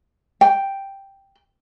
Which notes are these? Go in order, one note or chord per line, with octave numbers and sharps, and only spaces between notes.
G5